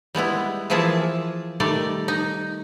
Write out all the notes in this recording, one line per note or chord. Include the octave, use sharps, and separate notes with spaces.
G3 G#3 B3 E4
E3 F3 A#3 G#4 E5 A5
D#3 G3 A3 D5
D#4